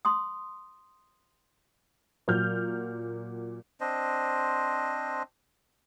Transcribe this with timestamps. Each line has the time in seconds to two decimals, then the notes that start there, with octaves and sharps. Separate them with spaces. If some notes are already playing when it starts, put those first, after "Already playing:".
0.05 C6 D#6
2.28 A#2 F#3 F6 G6
3.81 C4 D4 C5 D#5